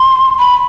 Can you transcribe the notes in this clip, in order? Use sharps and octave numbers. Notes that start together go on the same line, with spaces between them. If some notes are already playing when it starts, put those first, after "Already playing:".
Already playing: C6
B5